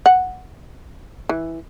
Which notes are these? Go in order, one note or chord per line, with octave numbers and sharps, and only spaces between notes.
F#5
E3